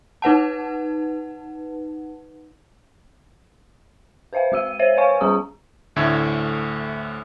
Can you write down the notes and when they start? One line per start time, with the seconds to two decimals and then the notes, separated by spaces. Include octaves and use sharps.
0.22 D#4 B4 F#5 A5
4.33 B4 C5 E5 F5 G5
4.52 G#3 F#4 E6 D#7
4.79 C5 C#5 E5 D#7
4.97 B4 C#5 F5 G#5 C#6
5.21 G3 C#4 G#4 A#5 D#6
5.96 D2 A2 D3 A3 E5 G#6